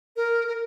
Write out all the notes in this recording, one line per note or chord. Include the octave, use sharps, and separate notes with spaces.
A#4
A#4